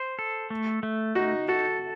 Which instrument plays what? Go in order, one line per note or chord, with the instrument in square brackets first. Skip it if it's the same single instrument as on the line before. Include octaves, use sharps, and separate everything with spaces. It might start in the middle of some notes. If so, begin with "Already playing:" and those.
Already playing: [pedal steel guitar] C5
A4
A3
A3
[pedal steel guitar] D#4 [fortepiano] F#4
[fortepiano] F#4 [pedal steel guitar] A4